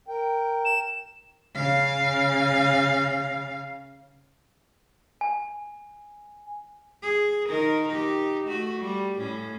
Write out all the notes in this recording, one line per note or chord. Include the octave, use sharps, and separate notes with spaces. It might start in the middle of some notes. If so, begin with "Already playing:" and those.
A#4 G5
E7
C#3 F5
G#5
G#4
D#3 D#4 A#4
D#4 G4
A3 F#4
G3
A2 C#4